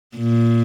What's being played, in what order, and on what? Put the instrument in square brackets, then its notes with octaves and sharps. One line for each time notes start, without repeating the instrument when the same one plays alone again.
[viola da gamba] A#2